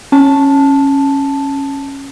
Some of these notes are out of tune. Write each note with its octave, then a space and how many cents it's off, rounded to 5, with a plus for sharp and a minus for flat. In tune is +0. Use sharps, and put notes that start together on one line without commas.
C#4 -10 A5 +0